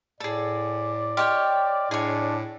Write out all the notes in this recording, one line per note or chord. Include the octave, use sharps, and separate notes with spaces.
A2 G#4 A4 D5
G4 C#5 D#5 G5 C6 F6
A2 D4 G#4 C#5